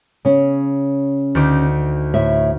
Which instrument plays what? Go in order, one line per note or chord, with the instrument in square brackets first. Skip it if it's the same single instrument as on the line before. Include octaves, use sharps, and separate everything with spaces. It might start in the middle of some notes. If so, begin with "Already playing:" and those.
[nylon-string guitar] C#3 C#4
[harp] D2 D#4 D6
[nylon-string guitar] A2 E5